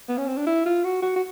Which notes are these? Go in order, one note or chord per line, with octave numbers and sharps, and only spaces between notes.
B3
C#4
C4
D4
E4
F4
F#4
F#4
F#4